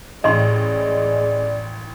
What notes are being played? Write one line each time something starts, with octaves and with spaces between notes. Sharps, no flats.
A1 G#3 C#4 D5 D#5 C6